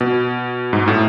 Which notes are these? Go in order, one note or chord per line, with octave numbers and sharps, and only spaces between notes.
B2
G#2
A2